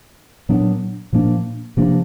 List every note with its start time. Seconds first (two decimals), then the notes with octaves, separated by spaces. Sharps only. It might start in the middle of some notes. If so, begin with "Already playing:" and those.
0.49 A#2 F#3 B3 D4
1.13 A#2 F3 A#3 D4
1.77 C3 F3 A#3 D4